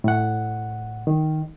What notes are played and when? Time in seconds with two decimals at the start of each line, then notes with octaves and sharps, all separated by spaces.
0.04 A2 F#5
1.07 D#3